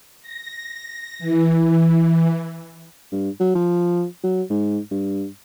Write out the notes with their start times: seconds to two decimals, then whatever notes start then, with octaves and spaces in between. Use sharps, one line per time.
0.21 A#6
1.19 E3
3.12 G2
3.40 F#3
3.55 F3
4.23 F#3
4.50 G#2
4.91 G2